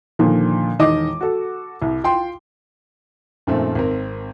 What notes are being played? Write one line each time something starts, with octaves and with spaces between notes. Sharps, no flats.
A#2 D3 D#3 F3
E1 D#3 D#5 D6
F#4 A4
C2
F4 G5 C6
F#2 A#2 D#3 F3 A3 C4
G#1 C4 A#4